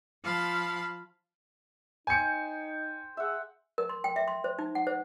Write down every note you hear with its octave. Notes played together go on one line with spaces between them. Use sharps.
F3 F5 A5 B5
D#4 C5 G5 G#5 C#7
G#4 E5 F#5
A#4
C6
G5
E5
C6
C5
D#4
F#5
C5